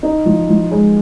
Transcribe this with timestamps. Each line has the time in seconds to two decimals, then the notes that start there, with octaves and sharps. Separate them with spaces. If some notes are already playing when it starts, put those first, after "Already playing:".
0.03 D#4
0.25 F3
0.49 F3
0.71 G#3